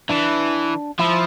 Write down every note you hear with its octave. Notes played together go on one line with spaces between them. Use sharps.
E3 D4
F3 E4